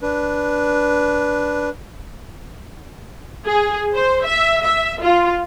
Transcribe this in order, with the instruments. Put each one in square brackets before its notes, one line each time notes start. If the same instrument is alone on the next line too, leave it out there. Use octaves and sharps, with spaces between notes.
[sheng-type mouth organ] D4 B4
[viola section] G#4
C5
E5
E5
F4